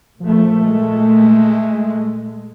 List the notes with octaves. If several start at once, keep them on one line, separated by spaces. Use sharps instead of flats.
A#2 F3 A3
G#3